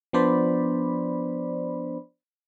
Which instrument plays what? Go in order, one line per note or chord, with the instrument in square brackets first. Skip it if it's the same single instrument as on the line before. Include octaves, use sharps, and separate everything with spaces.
[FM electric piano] F3 B3 D4 C5 D5 B5